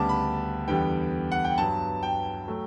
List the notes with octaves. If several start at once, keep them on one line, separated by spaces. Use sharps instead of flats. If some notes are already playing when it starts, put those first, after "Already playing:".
Already playing: D2 C#3 G3 B3 A5 D6
B5
E2 D3 G3 B3 G5
F#5
G5
G2 F#3 B3 A5
G5
F#3 A3